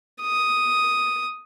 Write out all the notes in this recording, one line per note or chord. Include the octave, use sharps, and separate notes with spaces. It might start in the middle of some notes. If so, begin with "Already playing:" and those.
D#6